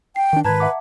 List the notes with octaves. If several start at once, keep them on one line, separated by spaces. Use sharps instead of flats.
G5 C7
D#3 D4
G#2 D#3 B4 A5 A#5 G#6
E5 F#5 D6